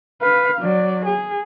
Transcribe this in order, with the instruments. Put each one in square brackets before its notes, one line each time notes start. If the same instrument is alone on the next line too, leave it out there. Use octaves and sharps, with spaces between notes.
[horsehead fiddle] B4 F5
F#3 D5
G#4